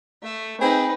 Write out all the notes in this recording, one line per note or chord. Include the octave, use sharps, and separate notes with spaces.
A3 E5
C4 D#4 G#4 B4 B5